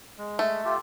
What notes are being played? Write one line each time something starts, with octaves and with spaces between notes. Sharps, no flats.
G#3
A3 E5
F4 G4 A4